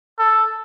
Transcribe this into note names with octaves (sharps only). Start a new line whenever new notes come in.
A4